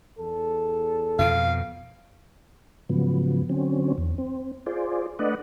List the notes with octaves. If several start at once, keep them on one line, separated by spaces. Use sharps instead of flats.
E2 A4
F2 B2 F5
G#2 C#3 F3 F#3 B3
D3 F#3 C4 C#4
E2
C4
F4 G#4 C5 D5
A3 D4 B4 D5 D#5 F#5